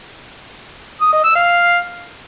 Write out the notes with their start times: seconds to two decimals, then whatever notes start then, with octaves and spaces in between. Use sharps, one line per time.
1.01 D#6
1.13 D#5
1.24 E6
1.36 F5